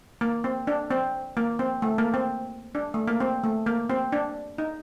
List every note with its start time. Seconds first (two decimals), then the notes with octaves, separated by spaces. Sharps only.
0.21 A#3
0.44 C4
0.67 D4
0.91 C4
1.37 A#3
1.59 C4
1.82 A3
1.98 A#3
2.14 C4
2.75 D4
2.94 A3
3.08 A#3
3.20 C4
3.44 A3
3.66 A#3
3.90 C4
4.12 D4
4.58 D#4